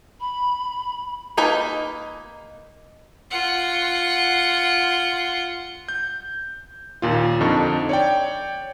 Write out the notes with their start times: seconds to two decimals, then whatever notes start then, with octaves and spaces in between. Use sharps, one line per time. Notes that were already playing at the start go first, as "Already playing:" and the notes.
0.20 B5
1.37 A#3 D#4 B4 G#5
3.31 F4 F#5
5.89 G6
7.02 D#2 A#2 F4
7.41 F2 D3 D#4 A5 C#6
7.89 C#5 D5 G5